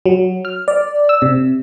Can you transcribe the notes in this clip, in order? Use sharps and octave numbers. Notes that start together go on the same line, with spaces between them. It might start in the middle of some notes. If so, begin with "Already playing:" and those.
F#3
F6
D5
E6
C3